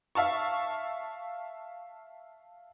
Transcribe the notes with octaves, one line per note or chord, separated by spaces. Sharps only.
E5 F5 A5 C#6